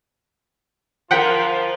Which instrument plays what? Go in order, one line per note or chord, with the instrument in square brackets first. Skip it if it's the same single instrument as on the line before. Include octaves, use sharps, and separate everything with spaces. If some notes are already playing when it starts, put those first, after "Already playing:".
[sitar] F3 A#4 [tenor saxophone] F4 [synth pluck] F#5 G5 B6